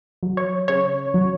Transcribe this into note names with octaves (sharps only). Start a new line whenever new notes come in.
F#3
C#5
C#3 C#5
F#3